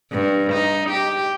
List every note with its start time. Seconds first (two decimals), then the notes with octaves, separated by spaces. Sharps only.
0.12 G2
0.52 D#4
0.89 G4